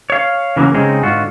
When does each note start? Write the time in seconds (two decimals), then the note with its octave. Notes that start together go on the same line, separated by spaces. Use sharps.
0.10 C#5 F5
0.56 C#3 E3 F#3 A#3 B3 C#4
0.74 C#3 G#3 C4 C#4 D#4 G#4
1.03 G#2 D3 F4 F#4